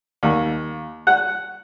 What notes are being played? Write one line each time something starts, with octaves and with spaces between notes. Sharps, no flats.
D#2
F#5